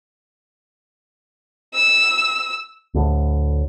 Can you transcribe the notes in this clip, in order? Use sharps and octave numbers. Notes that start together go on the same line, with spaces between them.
E6
D2 A2